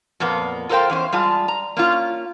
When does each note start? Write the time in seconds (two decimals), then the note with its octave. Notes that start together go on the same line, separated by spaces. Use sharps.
0.20 F2 A#2 A#3 B3
0.69 F4 A4 A#4 C5 F5 G5
0.90 E2 C#4 C5
1.13 G3 G#3 F4 A5
1.48 A#5
1.77 A#3 C#4 F4